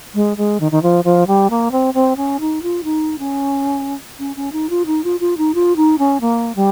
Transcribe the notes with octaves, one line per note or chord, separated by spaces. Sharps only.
G#3
G#3
D#3
D#3
F3
F3
G3
A#3
C4
C4
C#4
D#4
F4
D#4
C#4
C#4
C#4
D#4
F4
D#4
F4
F4
D#4
F4
D#4
C#4
A#3
G3